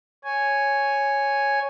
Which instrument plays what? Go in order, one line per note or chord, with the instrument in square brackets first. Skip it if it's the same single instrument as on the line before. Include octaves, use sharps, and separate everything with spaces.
[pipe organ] C#5 G#5